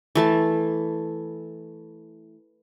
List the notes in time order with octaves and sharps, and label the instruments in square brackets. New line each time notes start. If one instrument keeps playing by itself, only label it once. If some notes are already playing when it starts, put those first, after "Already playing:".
[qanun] E3 A3 A5